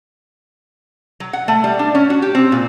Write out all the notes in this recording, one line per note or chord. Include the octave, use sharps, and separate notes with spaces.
F#3
F#5
A3
G3
D4
C#4
F#4
G4
C4
A#2